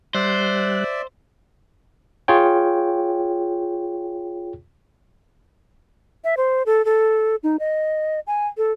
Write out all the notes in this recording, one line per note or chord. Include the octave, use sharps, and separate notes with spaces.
G3 C5 D5 E5 F#6
F4 G#4 C#5 G5
E5
C5
A4
A4
D#4
D#5
G#5
A4